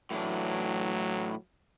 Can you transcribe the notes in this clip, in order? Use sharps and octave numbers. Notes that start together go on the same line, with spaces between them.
A2 E3 F#3 D4